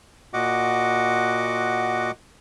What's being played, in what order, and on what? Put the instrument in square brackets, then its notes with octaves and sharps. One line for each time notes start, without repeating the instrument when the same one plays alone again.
[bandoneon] A#2 F#4 D#5 F#5 D6